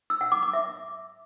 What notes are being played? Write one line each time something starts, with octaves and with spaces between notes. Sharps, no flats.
E6
F#5
D6
D6
E5